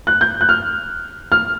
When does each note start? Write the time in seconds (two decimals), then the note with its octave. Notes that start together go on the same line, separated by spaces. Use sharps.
0.07 F#6
0.21 G6
0.41 F#6
0.49 F6
1.32 F6